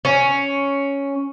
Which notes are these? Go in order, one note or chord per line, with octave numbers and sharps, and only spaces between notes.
C#4